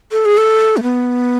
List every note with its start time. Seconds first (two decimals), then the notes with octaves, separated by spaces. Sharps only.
0.12 A4
0.25 G#4
0.37 A4
0.77 A3
0.83 B3